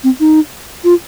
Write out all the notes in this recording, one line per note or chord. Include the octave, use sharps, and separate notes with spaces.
C4
D#4
F4